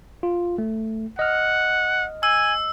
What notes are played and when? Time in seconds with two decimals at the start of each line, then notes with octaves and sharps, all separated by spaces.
0.23 F4
0.58 A3
1.19 D#5 F#5 F6
2.23 G#5 E6